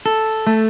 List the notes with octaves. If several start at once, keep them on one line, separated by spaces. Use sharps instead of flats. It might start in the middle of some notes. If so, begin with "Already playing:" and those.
A4
A3